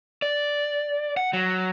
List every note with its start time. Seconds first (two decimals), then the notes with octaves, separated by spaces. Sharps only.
0.22 D5
1.17 F#5
1.33 F#3